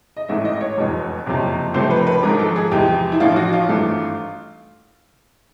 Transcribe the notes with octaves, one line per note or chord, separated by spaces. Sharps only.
D#5
A1 G#2 E3 A3 E5
D#5
C#5
F1 E2 B2 G#3
F#1 F2 C3 F3
C#2 C3 F3 A3 C5
B4
A#4
B4
G#1 G#2 F3 A#4
A4
G#4
E2 C3 F3 G#3 G4
E4
A1 A2 F3 F4
F#4
F4
G#1 G2 E3 A3